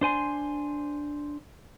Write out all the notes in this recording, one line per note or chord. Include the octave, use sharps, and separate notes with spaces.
D4 C5 G#5 C6